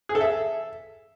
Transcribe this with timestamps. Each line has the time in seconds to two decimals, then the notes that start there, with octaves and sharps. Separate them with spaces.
0.09 G#4
0.15 A4
0.21 E5